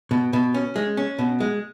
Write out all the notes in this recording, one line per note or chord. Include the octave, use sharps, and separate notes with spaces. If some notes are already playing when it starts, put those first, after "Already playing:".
B2
B2
C#4
G#3
C#4
B2
G#3